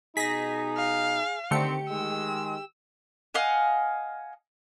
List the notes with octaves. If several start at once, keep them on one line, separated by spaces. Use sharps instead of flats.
B2 D#4 G#4 A#6 B6
F5
D3 D#3 A3 C4 G4 C#7
D#3 G#3 E6
D#5 F5 F#5 G#5